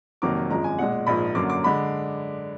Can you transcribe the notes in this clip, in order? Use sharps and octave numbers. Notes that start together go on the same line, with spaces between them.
F1 F2 D#3 F#3 A#3 D6
G#1 F#2 F3 G#3 A#5
G#5
B1 A#2 G#3 F#5
A#1 G#2 F3 A#3 B5
F#2 D3 F#3 A#3 D6
D6
D3 G#3 B5